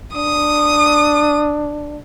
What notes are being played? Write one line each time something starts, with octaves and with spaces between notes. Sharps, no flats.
D4 D#6